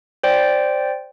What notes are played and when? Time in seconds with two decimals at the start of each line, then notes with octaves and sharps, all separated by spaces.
0.23 C5 D5 G5